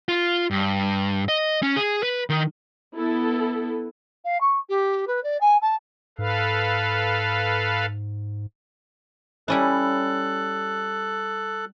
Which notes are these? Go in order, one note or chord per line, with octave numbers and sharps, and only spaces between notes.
F4
G2
D#5
C#4
G#4
B4
D#3
B3 E4 A4
F5
C#6
G4
B4
D5
G#5
A5
G#2 A4 B4 F5
G3 C#4 E4 A4 F#6